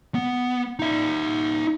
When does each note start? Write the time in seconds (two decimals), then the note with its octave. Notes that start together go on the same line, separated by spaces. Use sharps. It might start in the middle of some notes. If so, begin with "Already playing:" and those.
0.15 B3
0.79 D#4 E5